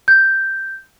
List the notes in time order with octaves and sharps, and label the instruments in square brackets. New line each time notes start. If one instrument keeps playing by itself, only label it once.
[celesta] G6